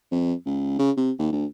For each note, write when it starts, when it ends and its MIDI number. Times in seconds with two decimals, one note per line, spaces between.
0.11 0.34 41
0.46 0.75 37
0.79 0.91 49
0.97 1.11 48
1.19 1.31 39
1.32 1.46 38